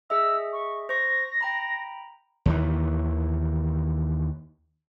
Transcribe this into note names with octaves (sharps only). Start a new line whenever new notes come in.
G#4 D#5 E5 E6
C#6
C5 C#6 A#6
G5 A#5 B5
D#2 D#3 E3